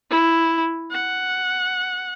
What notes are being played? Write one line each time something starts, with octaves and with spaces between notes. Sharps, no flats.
E4
F#5